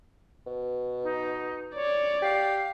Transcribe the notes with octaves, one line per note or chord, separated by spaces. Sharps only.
B2
D#4
C#5 D5
G4 F5